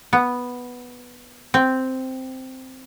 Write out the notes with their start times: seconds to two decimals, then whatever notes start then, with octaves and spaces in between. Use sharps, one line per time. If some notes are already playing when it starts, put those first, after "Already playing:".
0.13 B3
1.54 C4